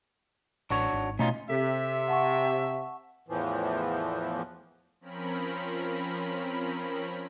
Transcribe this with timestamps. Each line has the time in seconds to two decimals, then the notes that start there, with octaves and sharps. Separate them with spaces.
0.70 A1 D4 F#4 C#5
0.93 G#1
1.19 B2 A3 C#4 D#4 F4
1.50 C3 A4 E5 B6
2.08 F#5 A5 C#6
3.28 E2 A2 E3 F3
5.01 F3 C4 C#4 A#4 B5